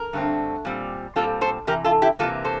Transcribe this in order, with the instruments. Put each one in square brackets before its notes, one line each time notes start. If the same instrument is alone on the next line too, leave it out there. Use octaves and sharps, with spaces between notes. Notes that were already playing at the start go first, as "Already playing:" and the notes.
Already playing: [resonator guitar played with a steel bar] A#4
G2 D3 A3 C4
A#2 G3 C4
A#2 G3 C4 F4 A4
A4 C5
C3 E3 G4 A#4
F4 A4
E4 G4
C3 E3 G3 A#3 F4 A4
A4 C5